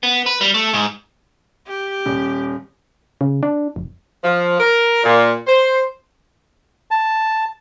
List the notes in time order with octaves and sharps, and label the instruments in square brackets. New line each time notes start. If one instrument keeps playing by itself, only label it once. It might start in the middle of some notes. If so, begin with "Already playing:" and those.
[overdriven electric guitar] B3
B4
G3
A3
G#2
[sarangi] G4
[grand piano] D#1
[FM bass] C#3
D4
F1
[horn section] F3
A#4
A#2
C5
[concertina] A5